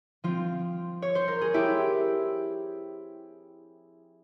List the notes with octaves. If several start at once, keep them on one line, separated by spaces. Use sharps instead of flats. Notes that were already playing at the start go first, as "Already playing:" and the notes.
F3 C4 F4
C#5
C5
A#4
G#4
E4 G4